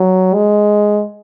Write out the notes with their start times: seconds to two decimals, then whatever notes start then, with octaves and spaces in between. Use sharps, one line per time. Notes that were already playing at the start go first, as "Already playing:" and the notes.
Already playing: F#3
0.34 G#3